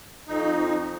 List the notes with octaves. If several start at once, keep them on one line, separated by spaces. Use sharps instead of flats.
F2 D#4